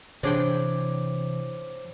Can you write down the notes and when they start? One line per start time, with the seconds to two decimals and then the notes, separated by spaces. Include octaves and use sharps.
0.23 C3 E3 D4 G#4 C5 C#5 G5 D6